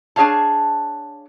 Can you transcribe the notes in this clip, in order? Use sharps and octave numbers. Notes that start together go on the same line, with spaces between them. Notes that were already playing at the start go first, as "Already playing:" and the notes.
D4 G#4 C#5 F5 A5